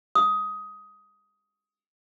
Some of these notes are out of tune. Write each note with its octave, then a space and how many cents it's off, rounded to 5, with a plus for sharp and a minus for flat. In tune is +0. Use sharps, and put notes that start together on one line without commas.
D#6 +15